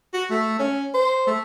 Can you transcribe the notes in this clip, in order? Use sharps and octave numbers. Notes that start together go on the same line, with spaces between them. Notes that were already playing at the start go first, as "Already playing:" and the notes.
F#4
A3
C#4
C5
A3